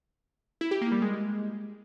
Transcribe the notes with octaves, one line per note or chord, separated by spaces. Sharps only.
E4
G4
A#3
G3
G#3